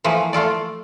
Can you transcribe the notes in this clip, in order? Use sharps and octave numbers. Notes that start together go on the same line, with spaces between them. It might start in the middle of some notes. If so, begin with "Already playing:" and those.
E3 F3 A3 A#3 B4
A3 F4 A4 D5